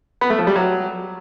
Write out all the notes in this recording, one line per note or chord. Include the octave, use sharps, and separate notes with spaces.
B3
A3
F3
G3
F#3